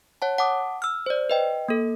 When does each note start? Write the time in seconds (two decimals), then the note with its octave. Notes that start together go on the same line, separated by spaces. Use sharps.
0.22 C#5 F#5 A5
0.38 F#5 A5 D6 D#6
0.82 E6 F6
1.06 C5 D5
1.30 B4 D#5 G5
1.68 A#3 A4